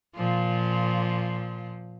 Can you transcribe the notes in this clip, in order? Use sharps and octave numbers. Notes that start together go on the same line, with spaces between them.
A#2 F3